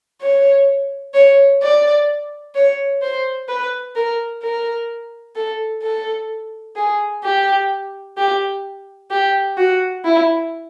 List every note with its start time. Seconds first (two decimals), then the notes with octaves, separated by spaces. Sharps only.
0.21 C#5
1.14 C#5
1.62 D5
2.55 C#5
3.02 C5
3.49 B4
3.96 A#4
4.42 A#4
5.36 A4
5.82 A4
6.76 G#4
7.24 G4
8.17 G4
9.11 G4
9.57 F#4
10.04 E4